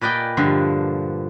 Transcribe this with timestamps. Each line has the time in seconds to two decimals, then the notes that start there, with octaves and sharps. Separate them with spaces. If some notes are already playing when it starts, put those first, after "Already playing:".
0.01 A#2 B4 D5 D#5 G5 G#5
0.37 G2 D3 F3